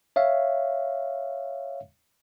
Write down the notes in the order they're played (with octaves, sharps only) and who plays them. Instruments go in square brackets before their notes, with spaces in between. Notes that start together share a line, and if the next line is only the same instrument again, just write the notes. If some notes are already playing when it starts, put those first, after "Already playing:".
[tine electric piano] C#5 E5 F5